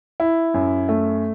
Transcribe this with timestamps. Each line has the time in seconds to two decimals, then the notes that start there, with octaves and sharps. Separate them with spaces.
0.20 E4
0.54 F#2
0.89 A3